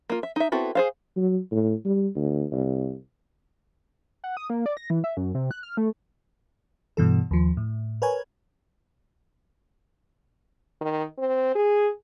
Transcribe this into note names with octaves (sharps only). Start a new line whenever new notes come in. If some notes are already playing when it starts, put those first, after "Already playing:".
A#3 F4
E5
D#4 E5
B3 C4 E4 F#4 A4
G#4 C5 F5
F#3
A2
G3
D2
C2
F#5
D#6
A#3
D5
A#6
E3
E5
F#2
C3
F#6
F6
A3
G2 B2 E3 A4
D#2 F3
A2
A#4 B4 C#5 G#5
D#3
C4
G#4